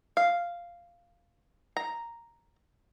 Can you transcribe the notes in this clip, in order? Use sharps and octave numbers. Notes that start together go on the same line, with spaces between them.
F5
A#5